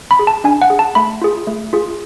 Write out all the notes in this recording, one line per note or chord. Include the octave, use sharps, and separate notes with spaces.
B5
G#4
A5
D4 G#5
F#5
G#4
A5
A3 B5
F4 G#4
A3
F4 G#4